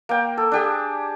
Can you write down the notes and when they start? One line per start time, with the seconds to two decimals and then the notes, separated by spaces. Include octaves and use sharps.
0.09 A#3 G5
0.37 A4
0.52 D4 G4 G#4